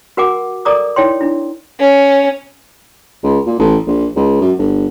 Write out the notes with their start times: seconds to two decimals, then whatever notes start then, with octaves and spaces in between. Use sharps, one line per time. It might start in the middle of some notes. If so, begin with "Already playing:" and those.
0.17 F#4 A#4 F#5 G#5 D6
0.65 A4 A#4 D5 A#5 D6 D#6
0.96 D#4 E4 C#5 G5 C6
1.21 D4 E4
1.80 C#4
3.23 C#2
3.47 A#2
3.59 A1
3.87 A#1
4.16 C#2
4.41 F#2
4.58 G1